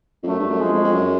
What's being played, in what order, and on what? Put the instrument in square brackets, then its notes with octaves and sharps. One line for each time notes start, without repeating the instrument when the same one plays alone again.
[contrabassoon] F2
[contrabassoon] F#2 [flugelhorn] A3
[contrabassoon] G2
F#2
[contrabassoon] F2 [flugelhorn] G#3
[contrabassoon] F2
F2
F#2